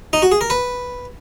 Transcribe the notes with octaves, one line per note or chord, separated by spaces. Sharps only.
D#4
F#4
G#4
A#4
B4